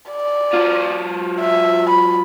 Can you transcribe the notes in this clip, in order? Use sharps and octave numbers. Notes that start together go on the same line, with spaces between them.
D5
F#3 F4
E5
B5